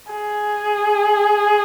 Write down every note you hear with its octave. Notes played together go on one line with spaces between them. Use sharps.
G#4